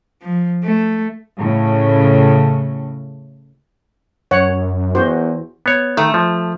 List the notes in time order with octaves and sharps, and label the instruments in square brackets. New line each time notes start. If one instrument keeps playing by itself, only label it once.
[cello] F3
A3
[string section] A2 C#3
[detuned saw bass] F#2 [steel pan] C#5 F#5
[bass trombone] E2 [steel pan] F#4 C5
[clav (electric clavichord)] B3 C#5
[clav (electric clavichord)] D#3 [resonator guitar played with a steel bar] A3
[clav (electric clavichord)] F3